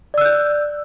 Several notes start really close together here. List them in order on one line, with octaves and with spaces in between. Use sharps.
D5 E6 F#6 G6